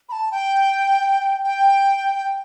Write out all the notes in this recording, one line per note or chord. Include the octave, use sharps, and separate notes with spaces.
B5
A5
G5
G5